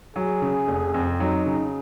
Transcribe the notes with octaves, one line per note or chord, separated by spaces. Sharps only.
F#3 G#4
C#3
F1
F2
F#3 D#4
C#3